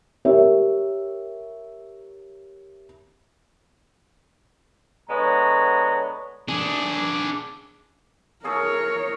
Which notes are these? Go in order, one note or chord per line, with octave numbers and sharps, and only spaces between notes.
G4 A#4 C#5 E5
D3 G#3 B3 C#5 A#5
D4 G#4
A3 G#4 A#4 C#5 D#6